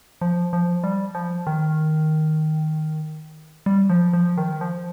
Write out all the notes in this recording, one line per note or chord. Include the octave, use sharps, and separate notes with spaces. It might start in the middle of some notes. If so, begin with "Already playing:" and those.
F3
F3
G3
F3
D#3
G3
F3
F3
D#3
F3